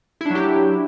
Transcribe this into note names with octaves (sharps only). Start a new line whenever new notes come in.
F#3 D4 E4 G4